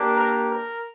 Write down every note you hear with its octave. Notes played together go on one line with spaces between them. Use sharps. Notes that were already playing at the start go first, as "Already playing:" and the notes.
Already playing: A#3 D4 G4
A#4
A#4